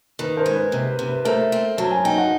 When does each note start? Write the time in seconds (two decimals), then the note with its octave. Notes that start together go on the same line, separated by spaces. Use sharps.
0.19 D#3 B4
0.37 A#4 C5
0.46 G#3
0.54 B4
0.72 C3 B4
0.90 B4
0.99 C3
1.07 B4
1.25 A3 A#4 C5
1.52 C4
1.77 F#3 A5
1.91 G#5
2.04 D#4 G5
2.18 F#5